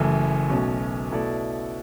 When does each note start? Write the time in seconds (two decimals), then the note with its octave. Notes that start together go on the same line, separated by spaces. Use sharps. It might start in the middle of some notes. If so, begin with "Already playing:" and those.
Already playing: F#1 F#2 E3 A3
0.49 B1 B2 F#3 A3 C#4
1.12 B2 A3 E4 A4 D5